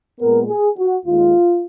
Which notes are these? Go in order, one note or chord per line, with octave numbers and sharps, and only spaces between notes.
A#2 G#3 B3 A#4
G#4
F#4
D#2 D#3 G#3 F4